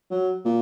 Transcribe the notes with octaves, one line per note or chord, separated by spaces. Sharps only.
F#3
A#2